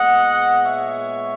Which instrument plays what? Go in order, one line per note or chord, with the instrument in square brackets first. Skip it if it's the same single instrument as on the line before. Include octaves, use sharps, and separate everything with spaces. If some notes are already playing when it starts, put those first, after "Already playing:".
Already playing: [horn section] A#2 G#3 B3 D#5 F#5
C#5 E5